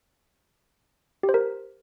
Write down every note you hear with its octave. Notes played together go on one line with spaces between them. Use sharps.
G4
C5
A#4